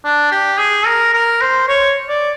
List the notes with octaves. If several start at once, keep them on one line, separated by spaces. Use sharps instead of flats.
D4
G4
G#4
A#4
A#4
C5
C#5
D5